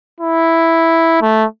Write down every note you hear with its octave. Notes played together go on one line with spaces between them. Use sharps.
E4
A3